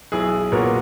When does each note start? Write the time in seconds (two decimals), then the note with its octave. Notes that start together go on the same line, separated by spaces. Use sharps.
0.12 B1 E4 G#4
0.52 A#2 F#3 B3 A#4 C#5